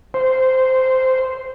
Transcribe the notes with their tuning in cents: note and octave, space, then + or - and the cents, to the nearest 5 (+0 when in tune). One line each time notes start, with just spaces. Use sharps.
C5 -10